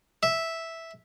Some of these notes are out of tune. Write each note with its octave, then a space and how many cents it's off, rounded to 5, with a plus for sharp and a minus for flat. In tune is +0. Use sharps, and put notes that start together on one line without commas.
E5 -5